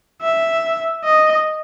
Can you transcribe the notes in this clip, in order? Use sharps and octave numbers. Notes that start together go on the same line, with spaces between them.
E5
D#5